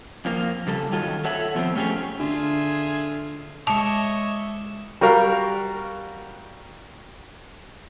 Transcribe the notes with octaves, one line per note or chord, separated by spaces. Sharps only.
F2 F3 A#3
C#3 G3 A4
D#3 F#3 F4 A4
A4 C#5 E5 F#5
B2 F3 B3 C4
A3 C#4 G4 G#4 C#5
D3 F4 G#4 E5
G#3 C#5 D#5 E5 A5 D6 C#7 E7
G3 F#4 A#4 F5